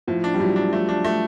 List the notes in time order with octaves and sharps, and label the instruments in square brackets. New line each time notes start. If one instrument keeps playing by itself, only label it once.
[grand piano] A2 [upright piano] F3
[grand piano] D4
[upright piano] G3
[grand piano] A2 [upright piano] F#3
[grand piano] D4
[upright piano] F3 [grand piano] A3
[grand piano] D4
A3